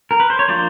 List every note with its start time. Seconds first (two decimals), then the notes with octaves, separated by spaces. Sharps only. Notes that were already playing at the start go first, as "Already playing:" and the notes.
0.11 A#4
0.20 B4
0.30 C5
0.39 C#5
0.48 F3 A#3 D4 C5 D5